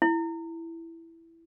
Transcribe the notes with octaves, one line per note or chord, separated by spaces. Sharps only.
E4